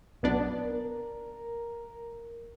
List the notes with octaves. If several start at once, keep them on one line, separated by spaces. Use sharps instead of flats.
B1 B3 D4
A#4